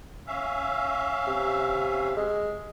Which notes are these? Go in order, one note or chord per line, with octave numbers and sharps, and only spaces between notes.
C#4 E5 F5
C3
G#3